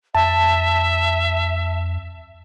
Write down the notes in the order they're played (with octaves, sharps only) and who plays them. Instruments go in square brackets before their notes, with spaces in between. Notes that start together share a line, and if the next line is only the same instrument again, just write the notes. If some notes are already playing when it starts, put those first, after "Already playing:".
[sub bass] F2 [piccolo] E5 [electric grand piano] A5